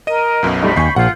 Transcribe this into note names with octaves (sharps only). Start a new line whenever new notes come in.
A#4 D#5 D#7
B1 F#2 B2
G3 A3 D#4 B5
D#2 G#5 C#6 G6 C7
A#1 F4 F#5